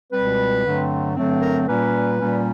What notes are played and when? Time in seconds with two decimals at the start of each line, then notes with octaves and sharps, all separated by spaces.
0.13 C#2 B2 G3 C4 B4
0.65 G2 D3 F#3 A3 C4
1.16 G2 D3 F#3 A3 C4
1.41 A#4
1.68 A#2 G3 A#3 C#4 B4
2.19 A#2 G3 A#3 C#4